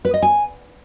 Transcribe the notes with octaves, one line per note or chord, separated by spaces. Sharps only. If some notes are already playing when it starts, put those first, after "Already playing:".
B4
D#5
G#5